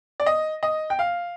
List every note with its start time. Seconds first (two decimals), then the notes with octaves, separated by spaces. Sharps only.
0.20 D5
0.26 D#5
0.63 D#5
0.90 G5
0.99 F5